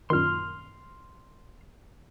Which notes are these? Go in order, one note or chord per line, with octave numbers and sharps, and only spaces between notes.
F#2 A#2 D#3 C6 F6